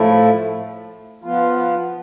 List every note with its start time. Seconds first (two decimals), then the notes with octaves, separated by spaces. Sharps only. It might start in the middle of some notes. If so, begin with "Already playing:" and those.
Already playing: A2 F3 A3 E4
1.24 F3 B3 F4